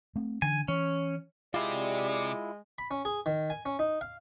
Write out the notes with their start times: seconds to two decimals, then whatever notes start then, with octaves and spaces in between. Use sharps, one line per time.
0.16 A3 C4
0.42 D3 E3 D4 G#5
0.68 E3 C#4
1.54 C3 G#3 E4 F4 G4 D5
2.78 B5
2.91 C#4
3.05 G#4
3.26 D#3
3.50 G#5
3.66 C#4
3.79 D#4
4.01 F5